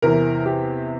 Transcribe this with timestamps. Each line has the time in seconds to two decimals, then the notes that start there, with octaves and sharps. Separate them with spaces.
0.02 E2 C3 E3 A#4
0.46 G4